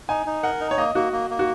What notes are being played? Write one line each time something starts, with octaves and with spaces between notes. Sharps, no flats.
D#4 G#5
D#4
A#4 F#5
D#4
C#5
A#3 D#5
A#3 F#4
A#3
A#3
F#4